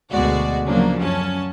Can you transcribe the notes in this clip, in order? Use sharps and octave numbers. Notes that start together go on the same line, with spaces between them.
D2 B2 G#3 F#4 D5
C#3 F3 F#3 A#3 D4
F#2 C#4 A5